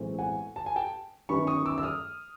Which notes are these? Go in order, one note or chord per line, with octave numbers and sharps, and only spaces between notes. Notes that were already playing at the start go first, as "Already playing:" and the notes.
Already playing: B1 A2 E3 G#3 C4
F#5 G#5
A5
G#5
G5 A5
G1 F#2 D#3 G3 B5 C#6
C#6 D#6
D6 E6
E6
D#6 F6